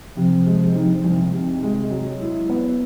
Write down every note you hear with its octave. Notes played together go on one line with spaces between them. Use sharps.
C3 F3
G#3
D#3
C2
C3
G#3
F#3
E4
B3